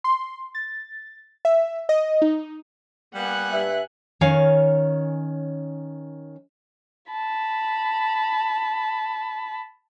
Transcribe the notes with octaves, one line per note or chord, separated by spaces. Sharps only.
C6
A6
E5
D#5
D#4
G3 A#3 B3 F#5 G#5 F#6
G2 E5
D#3 C#4 C#5 F5 G#5
A5 B5